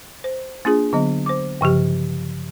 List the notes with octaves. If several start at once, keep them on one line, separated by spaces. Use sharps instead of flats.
C5
A#3 D4 F4 G#4
D3 F#3 B3 D#5
C5 D6
G2 C#3 F3 G4